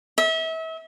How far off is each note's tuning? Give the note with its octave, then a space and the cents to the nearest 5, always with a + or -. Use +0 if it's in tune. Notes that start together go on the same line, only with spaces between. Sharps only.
E5 -35